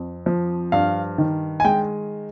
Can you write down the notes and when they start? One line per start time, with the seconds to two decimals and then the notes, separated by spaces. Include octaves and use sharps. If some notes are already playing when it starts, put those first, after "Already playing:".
Already playing: F2
0.26 F3
0.72 G2 F5
1.18 D#3
1.60 G#5
1.64 G#3 G5